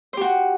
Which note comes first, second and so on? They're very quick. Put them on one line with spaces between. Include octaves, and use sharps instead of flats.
C5 G4 F#4